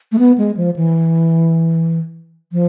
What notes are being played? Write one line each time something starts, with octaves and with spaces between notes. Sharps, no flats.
A3
B3
G#3
F3
E3
F3